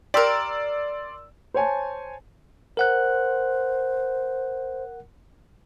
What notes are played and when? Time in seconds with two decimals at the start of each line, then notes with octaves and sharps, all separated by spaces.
0.14 G4 A#4 D5 C6 E6
1.54 C5 C#5 G#5 A5
2.77 A#4 C5 F#5 F#6